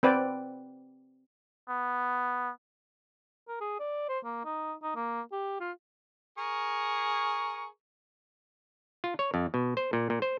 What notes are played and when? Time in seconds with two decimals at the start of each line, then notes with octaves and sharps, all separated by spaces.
0.03 C4 B4 D5 G5
1.69 B3
3.48 A#4
3.61 G#4
3.79 D5
4.09 C5
4.25 A#3
4.45 D#4
4.83 D#4
4.96 A#3
5.32 G4
5.60 F4
6.38 G#4 A#4 C#6
9.04 F4
9.19 C#5
9.34 F2
9.54 B2
9.77 C5
9.93 A#2
10.10 A#2
10.22 C5